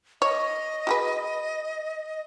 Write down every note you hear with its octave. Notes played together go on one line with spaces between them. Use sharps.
C#5 D#5
F#4 G#4 B4